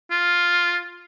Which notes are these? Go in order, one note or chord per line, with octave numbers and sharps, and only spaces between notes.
F4